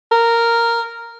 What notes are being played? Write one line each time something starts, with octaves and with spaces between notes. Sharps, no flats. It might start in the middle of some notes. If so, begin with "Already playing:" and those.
A#4